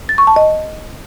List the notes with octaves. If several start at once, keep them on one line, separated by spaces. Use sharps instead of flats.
A6
C#6
A5
D#5